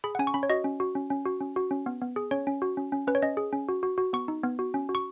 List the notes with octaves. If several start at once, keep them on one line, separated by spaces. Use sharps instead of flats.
G#4 B5
F#5
C#4 G#5
C#6
C#4 B5
C#5
F#4 D#5
C#4
F#4
C#4
C#4
F#4
C#4
F#4
C#4
B3
B3
G#4
C#4 C#5
C#4
F#4
C#4
C#4
C#4 B4
C#5
C#4 D#5
G#4
C#4
F#4
F#4
F#4
B3 C#6
D#4
B3
F#4
C#4
F#4
C#6